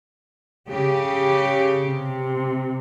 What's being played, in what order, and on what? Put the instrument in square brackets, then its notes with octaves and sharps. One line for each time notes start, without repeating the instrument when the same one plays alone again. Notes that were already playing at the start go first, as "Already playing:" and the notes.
[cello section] C#3 G4
[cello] C3